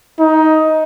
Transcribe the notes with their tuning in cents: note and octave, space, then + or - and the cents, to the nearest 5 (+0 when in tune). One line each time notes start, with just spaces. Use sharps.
D#4 +15